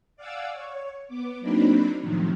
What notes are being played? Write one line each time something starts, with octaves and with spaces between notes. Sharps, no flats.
D5 F5 F#5 G#5 D6 E6
C#5
B3 D6
F#3 A#3 C4 D4 D#4 B5
A2 C3 D#3 F3 F#3